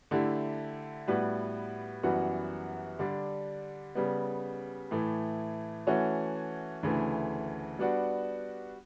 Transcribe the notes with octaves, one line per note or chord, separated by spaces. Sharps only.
D3 A3 E4 G4
A2 G3 B3 F#4 B4
F#2 E3 G3 B3 F#4
D3 G3 D4
C#3 G3 B3
A2 E3 A3
E3 A3 C#4 F#4
D2 C#3 E3 A3
G3 B3 D4 F#4